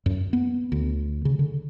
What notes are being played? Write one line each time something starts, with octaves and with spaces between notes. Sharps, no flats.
F#2
B3
D2
C#3
D3